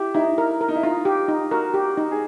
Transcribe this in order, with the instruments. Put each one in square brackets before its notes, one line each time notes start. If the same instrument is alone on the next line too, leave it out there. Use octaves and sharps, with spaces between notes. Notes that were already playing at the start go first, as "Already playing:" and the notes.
Already playing: [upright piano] E4 [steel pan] G4
[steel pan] D#4 [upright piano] E4
[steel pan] A#4
A#4
[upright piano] D#4
E4
[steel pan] D#4 [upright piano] F4
[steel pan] G4
D#4
[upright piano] F#4 [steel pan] A#4
[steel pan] G4
D#4
[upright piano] G#4